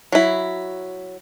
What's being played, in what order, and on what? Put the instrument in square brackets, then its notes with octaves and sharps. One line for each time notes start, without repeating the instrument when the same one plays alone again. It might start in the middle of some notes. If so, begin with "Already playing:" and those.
[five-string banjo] F#3 E4